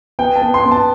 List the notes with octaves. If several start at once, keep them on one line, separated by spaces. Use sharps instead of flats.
B3 G5
A5
B3
C6
B3
A5